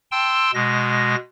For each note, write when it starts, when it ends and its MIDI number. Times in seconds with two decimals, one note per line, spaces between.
0.12 0.51 79
0.12 0.51 81
0.12 0.51 84
0.12 0.51 88
0.54 1.15 47
0.54 1.15 56
0.54 1.15 94